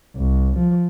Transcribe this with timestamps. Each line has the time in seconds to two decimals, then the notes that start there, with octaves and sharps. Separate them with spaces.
0.16 C2
0.58 F3